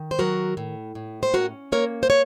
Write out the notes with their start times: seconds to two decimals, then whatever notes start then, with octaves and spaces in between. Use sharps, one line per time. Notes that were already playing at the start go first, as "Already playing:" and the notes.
Already playing: D#3
0.11 C5
0.19 F#3 F#4 A#4
0.57 A2
0.95 A2
1.23 C5
1.33 C#4 F#4 A#4
1.72 A#3 A#4 C#5
2.03 C5
2.10 C#5